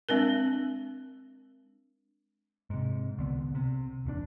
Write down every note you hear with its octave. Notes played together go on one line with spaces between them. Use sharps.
G#3 C4 D4 A#4
G#2 C3
C2 D3 B3
C3
D1 E2 E3 D4